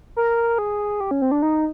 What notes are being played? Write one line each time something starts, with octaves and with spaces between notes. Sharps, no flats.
A#4
G#4
G4
C#4
C4
D4
D#4